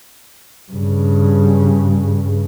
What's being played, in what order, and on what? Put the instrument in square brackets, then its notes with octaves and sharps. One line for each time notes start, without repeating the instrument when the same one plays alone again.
[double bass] G2 C#3